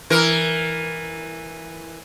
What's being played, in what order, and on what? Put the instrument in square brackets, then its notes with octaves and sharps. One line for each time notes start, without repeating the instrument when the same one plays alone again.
[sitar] E3 A#4